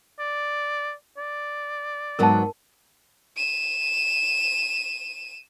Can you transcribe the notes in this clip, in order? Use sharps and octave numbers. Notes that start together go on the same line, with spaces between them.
D5
D5
G#2 F#3 B3 A#4 A5
D#7 E7